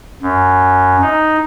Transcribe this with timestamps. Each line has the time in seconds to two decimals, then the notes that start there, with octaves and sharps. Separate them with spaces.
0.22 F#2
1.02 D#4